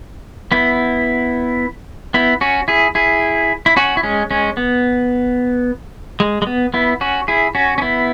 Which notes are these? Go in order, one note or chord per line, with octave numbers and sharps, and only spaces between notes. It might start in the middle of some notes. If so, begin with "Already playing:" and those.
B3 E4
B3 E4
C#4 F#4
E4 G#4
E4 G#4
E4
C#4 F#4
E4
G#3 C#4
G#3 C#4
B3
G#3
G#3
B3
B3 E4
C#4 F#4
E4 G#4
C#4 F#4
C#4
B3 E4